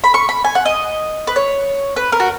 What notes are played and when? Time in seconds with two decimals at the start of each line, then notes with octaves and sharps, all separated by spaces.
0.04 B5
0.14 C#6
0.29 B5
0.45 G#5
0.55 F#5
0.65 D#5
1.27 B4
1.36 C#5
1.96 B4
2.12 A#4
2.20 F#4